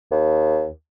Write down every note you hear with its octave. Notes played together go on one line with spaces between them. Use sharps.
D#2